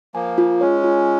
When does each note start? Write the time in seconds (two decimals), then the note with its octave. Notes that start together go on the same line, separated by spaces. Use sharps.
0.14 F3 A#3 G#5
0.38 F4
0.61 G#3 C#4 C#5
0.84 F4